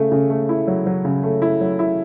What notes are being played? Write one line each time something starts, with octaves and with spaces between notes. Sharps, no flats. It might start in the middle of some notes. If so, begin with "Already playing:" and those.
Already playing: C#3 A3
C#3
A3
E4
F#3
F#3
C#3
A3
E4
F#3
E4